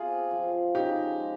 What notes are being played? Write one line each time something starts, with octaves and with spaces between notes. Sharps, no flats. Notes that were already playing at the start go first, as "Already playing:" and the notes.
Already playing: C3 F4 G#4
F3
C#3 D#4 G4
G#3